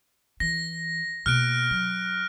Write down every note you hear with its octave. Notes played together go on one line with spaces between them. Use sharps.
E3 A#6
B2 A#3 F6 F#6 D7
F#3